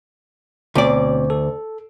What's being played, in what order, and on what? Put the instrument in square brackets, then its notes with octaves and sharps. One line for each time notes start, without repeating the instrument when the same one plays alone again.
[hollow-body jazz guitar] D2 D5 [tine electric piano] B2 C4 C#5
[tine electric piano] A4